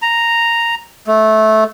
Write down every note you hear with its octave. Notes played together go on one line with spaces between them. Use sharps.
A#5
A3